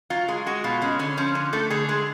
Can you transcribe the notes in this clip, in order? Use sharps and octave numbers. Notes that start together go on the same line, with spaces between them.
F#3 F4
G#3 G#4
G#3 F#4
B2 F4
G#3 C#4
D3 C#4
F3 C#4
D3
A3 A4
D3 G#4
G#3 G#4